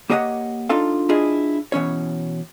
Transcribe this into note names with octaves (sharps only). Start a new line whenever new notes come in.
A#3 G4 C#5 D#5 F5 F#5
D4 D#4 F4 A4 F5
D4 E4 F4 G#4 D#5
B2 E3 C#4 C#5